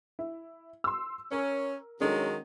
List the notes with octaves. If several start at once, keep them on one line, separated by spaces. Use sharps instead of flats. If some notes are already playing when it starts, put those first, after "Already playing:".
E4
C6 E6
C#4 A#4
D#3 F#3 G#3 C#4 D4 A4